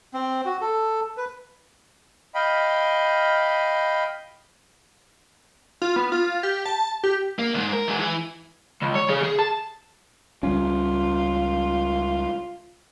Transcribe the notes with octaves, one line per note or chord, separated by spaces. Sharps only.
C4
F#4
A4
B4
D#5 F5 G5 B5
F4
B3
F4
G4
A5
G4
A#3
C#2 G#2
A#4
E3 G#3
E3
C#2
C#5
C#3 G#4
G#4
A5
C#2 G3 C#4 F4